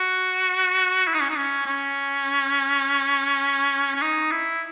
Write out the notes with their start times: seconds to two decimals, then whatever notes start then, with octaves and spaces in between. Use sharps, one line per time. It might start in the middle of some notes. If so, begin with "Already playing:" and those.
Already playing: F#4
1.08 E4
1.14 D#4
1.21 C#4
1.30 D#4
1.37 C#4
1.66 C#4
3.95 C#4
4.02 D#4
4.32 E4